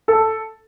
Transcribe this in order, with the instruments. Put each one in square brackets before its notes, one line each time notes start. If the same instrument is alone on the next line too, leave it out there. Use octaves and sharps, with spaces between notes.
[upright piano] A4